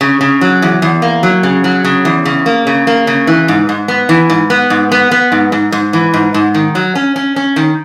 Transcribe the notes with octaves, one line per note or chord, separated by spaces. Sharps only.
C#3
C#3
F#3
E2
E2
A#3
F#3
C#3
F#3
C#3
E2
C#3
A#3
C#3
A#3
C#3
E3
G#2
G#2
B3
E3
G#2
B3
G#2
B3
B3
G#2
G#2
G#2
E3
G#2
G#2
D#3
F#3
C#4
C#4
C#4
D#3